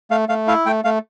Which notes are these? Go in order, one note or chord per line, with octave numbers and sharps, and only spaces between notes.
A3 F5
A3 F5
E4 F5
A3 G5
A3 F5